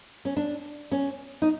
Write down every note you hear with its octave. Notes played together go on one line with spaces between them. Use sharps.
C#4
D4
C#4
D#4